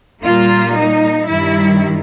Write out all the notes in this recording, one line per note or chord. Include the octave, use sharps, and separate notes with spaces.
A#2 G3 A#3 F4
D#4
G2 D#3 G3 E4